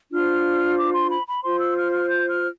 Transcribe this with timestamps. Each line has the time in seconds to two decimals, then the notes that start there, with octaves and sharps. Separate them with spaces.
0.11 D4 F4 C5 F6
0.77 D6
0.93 C6
1.09 B5
1.26 B5
1.43 F4 C5 C6
1.59 E6
1.76 F6
1.91 F6
2.08 G6
2.29 F6